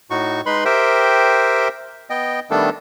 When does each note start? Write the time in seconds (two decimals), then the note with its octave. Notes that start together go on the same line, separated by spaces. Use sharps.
0.11 A2 D#4 F#4 C#6
0.46 G#3 D#4 B4 B5 C6
0.65 G4 A#4 C5 E5 G5
2.10 B3 D#5 G5
2.50 D#3 G3 A3 B3 D4 A4